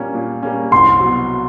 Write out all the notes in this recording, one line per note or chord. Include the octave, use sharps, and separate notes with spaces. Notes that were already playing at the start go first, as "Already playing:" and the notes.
Already playing: A#2 G3 A#3 C#4
A#2
G3 A#3 C#4
C2 C6
B2 F#3